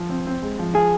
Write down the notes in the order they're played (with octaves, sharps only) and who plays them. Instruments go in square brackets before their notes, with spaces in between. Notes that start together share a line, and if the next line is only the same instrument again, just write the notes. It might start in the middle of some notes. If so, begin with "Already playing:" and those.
Already playing: [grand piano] F3
C4
C4
G#3
F3
[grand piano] F3 [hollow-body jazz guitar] G#4